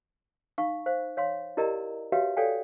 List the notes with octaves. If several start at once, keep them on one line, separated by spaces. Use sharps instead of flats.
D#4 F5 C#6
C5 F5
C#5 F5 C6
E4 G4 A#4 D5 D#5 A#5
F#4 G4 B4 C#5 E5 F5
A4 C#5 D5 F5 G5 G#5